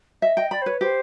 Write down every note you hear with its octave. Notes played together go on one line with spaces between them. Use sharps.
D#5 E5
D#5 G5
D5 B5
C5
B4 C#5
G4 C5